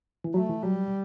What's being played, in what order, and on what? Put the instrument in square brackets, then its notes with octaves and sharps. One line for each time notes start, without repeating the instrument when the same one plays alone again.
[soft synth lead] E3
[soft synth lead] F#3 [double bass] A3
[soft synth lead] E3
[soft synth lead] F#3 [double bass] G3